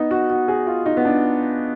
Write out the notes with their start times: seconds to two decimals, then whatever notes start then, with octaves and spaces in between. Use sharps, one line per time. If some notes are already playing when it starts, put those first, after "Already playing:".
Already playing: B3 D#4
0.11 F#4
0.30 F#4
0.48 G#4
0.67 F4
0.86 D#4
0.97 B3
1.05 D4